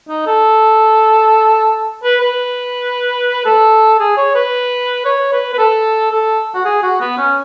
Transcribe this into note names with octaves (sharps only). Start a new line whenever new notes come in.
D#4
A4
B4
B4
A4
G#4
C#5
B4
C#5
B4
B4
A4
A4
F#4
G#4
F#4
B3
C#4